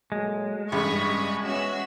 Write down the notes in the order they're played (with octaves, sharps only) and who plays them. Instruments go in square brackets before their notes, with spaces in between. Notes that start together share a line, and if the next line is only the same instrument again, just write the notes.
[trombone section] A#2 F#3 A3 [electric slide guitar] G#3
[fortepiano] A1 C#3 [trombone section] G2 [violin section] B5 C#6 D#6
[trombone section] B3 C#4 [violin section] F#4 E5 E6